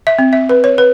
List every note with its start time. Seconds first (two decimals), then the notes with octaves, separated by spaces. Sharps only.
0.07 E5
0.19 C4
0.33 E5
0.49 B4
0.64 C#5
0.78 B4